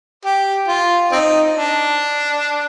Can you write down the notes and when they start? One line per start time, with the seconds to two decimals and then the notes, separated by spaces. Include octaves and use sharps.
0.25 G4
0.68 F4
1.12 C4 D#4
1.55 D4